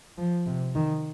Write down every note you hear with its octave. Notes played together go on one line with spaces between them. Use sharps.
F3
C3
D#3